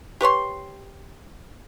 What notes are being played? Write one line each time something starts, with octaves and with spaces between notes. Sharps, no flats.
G4 B4 C#5 C6